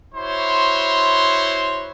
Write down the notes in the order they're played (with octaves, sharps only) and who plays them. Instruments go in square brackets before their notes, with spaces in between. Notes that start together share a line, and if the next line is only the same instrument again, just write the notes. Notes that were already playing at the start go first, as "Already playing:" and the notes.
[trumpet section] E4 F#4 C5 C#5 C6